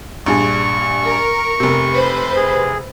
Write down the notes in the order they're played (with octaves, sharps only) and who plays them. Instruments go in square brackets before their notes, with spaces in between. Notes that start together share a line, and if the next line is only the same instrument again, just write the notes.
[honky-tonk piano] A#1 G2 G#4 [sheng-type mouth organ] C#6
[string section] A#4
[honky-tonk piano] F1 C3
[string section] B4 C5
[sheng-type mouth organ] G#4